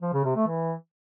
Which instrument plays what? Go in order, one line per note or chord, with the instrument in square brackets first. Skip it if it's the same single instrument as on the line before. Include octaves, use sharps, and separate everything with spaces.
[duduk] F3
C#3
C3
A3
E3